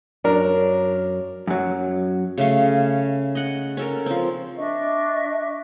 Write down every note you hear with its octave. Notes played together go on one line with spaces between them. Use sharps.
F#2 F#3 D4 A#4
F#2 F#3
C#3 A3 F5
D#5 F#5
C#4 A4 A#4
F3 C4
D4 D#5 E5 C#6